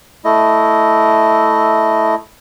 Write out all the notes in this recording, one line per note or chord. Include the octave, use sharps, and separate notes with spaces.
A3 E4 D#5